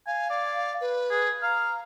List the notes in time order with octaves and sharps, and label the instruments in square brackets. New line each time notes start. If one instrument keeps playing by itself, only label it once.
[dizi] F5 [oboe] G#5
[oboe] D5
[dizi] B4
[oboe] G#4
[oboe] F5 [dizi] A#5